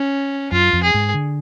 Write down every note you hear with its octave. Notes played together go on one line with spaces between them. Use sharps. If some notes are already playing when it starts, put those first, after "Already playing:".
Already playing: C#4
F#2 F4
F2
G#4
G#2
D3